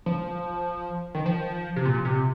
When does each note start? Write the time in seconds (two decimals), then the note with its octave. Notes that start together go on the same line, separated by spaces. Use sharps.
0.06 F3
1.15 D#3
1.26 F3
1.76 C3
1.85 A#2
2.05 C3